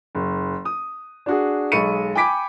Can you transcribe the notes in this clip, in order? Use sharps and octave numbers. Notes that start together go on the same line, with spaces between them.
F#1
D#6
D4 F#4 G#4
B1 G#3 B5 C#6 C#7 D#7
G5 G#5 B5 D6 B6 D7